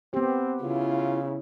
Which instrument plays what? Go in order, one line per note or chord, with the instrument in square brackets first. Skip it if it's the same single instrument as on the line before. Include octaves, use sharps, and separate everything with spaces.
[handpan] B3 G4 [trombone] C4
[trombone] C#3 [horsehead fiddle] E4 [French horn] F4